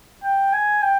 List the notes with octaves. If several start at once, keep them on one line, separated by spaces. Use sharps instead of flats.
G5
G#5
G5